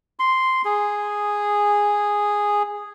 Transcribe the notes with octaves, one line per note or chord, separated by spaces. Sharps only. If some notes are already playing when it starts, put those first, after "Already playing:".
C6
G#4